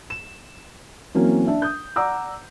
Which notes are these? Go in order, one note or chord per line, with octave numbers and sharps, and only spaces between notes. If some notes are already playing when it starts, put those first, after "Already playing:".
E7
E3 F#3 A#3 C4 C#4
D4 E5
D#6 G6
D5 F#5 A#5 D6 E6